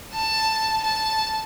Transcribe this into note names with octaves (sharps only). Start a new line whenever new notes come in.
A5
A5